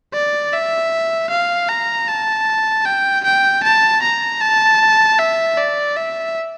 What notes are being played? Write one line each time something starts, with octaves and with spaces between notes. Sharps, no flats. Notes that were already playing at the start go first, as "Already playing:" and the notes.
D5
E5
F5
A#5
A5
G5
G5
A5
A#5
A5
E5
D5
E5